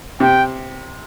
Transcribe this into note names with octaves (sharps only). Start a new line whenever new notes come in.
C3 G5